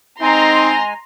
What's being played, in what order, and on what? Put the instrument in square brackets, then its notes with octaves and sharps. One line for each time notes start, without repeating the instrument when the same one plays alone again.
[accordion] G#3 G#5 [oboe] C4 [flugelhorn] D#4 [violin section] A#5 C6